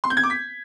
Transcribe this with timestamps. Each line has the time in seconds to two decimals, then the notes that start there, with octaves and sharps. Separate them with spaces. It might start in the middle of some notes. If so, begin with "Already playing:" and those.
0.04 C6
0.10 G6
0.17 G#6
0.23 D6
0.30 B6